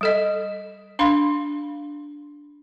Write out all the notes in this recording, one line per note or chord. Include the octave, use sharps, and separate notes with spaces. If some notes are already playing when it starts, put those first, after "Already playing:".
G3 A4 D#5
D4 F5 B5 C6